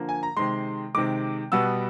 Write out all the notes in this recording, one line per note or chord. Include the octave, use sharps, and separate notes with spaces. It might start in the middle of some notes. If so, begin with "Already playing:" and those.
Already playing: D3 F3 A#3
G#5
A#5
C3 D#3 G#3 C6
C3 D#3 G#3 D6
B2 G3 B3 E6